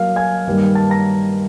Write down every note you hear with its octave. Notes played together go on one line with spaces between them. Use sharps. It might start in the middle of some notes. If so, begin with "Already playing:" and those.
Already playing: F#3 A#3 F5 F6
G#5 G#6
G2 D#3 G3 A#3
A5 A6
A#5 A#6